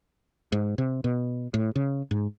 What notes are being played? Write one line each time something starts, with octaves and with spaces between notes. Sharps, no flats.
G#2
C3
B2
A2
C#3
G#2